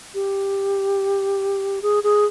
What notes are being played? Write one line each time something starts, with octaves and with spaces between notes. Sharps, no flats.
G4
G#4
G#4